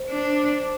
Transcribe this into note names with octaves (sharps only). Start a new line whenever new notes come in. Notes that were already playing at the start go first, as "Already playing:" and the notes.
Already playing: C5
D4